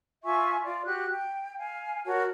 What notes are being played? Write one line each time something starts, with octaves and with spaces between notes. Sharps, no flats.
F4 E5 G#5 C#6
F4 D5
F#4 G4 F#6
G5
F5 G#5
F#4 A#4 C#5 A5